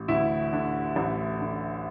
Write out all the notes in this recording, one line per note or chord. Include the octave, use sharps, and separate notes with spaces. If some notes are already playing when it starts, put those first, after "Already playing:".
Already playing: A1
D2 E4
D3
A1
D3